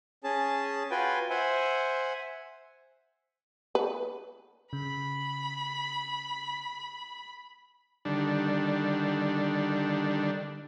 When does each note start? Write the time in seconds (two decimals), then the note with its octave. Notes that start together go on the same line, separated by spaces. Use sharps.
0.24 C#4 G#4 A5
0.91 F4 F#4 B4 G5 G#5
1.30 C5 E5 F#5 G#5
3.75 B4
4.73 C#3 B5
8.05 D3 D#3 G3 D4